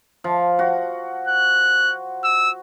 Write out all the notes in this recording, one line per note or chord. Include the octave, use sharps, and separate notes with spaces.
F3
F#4
F#6
E6